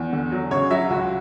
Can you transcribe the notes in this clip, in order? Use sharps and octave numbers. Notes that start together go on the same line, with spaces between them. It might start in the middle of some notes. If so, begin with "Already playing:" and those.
Already playing: E2
D3
F#3
C#3 C#5
F#3 E5
C#2 F#4